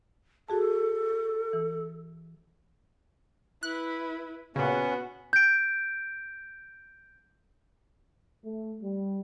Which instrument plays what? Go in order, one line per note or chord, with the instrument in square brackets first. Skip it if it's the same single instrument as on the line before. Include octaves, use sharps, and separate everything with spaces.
[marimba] F#4 G#4 A5 [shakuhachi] A4
[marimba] E3
[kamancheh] E4 B4 [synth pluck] F#6
[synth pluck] A#2 C#3 [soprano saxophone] B3 [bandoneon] C#4 [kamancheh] F#4
[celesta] G6 D7
[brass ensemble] A3
G3